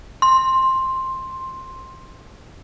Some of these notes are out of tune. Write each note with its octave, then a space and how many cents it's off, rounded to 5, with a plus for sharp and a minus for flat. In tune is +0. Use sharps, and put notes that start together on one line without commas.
C6 +10